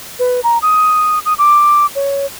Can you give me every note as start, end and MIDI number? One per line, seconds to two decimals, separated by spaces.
0.19 0.40 71
0.44 0.58 82
0.62 1.19 87
1.25 1.34 87
1.38 1.86 86
1.95 2.26 73